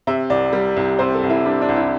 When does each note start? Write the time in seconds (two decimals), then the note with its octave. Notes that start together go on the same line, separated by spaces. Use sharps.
0.07 C3 E5
0.30 C2 D5
0.53 G3
0.76 C2
0.99 C3 C5
1.14 A4
1.23 C2
1.30 E4
1.45 G3 D4
1.62 D4
1.69 C2
1.76 E4